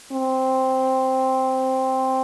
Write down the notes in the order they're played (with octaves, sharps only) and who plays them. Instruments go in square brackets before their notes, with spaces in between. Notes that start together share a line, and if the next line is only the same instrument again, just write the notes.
[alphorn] C4